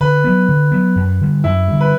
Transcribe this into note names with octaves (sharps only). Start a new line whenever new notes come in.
D3 B4
F#3 B3
D3
F#3 B3
F#2
D3 G3
F#2 E4
D3 G3
B4